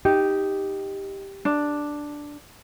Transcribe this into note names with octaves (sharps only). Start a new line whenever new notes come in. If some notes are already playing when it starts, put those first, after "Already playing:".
D#4 G4
D4